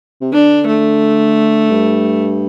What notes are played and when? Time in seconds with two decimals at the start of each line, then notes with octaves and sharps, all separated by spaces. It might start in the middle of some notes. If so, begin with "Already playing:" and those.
0.21 C3
0.32 D3 D4
0.66 A3
1.70 G2